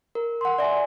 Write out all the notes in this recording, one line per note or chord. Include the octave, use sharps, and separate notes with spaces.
A#4
F#5 C6
D5 E5 G#5